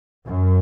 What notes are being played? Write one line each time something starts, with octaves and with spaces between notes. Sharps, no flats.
F#2